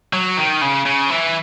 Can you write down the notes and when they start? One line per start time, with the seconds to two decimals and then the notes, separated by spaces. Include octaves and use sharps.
0.13 F#3
0.37 D#3
0.61 C#3
0.85 C#3
1.10 E3